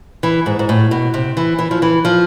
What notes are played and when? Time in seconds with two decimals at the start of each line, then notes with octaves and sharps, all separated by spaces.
0.23 E3
0.46 G#2
0.59 G#2
0.69 A2
0.91 B2
1.14 C3
1.37 E3
1.59 E3
1.71 F3
1.82 E3
2.05 F3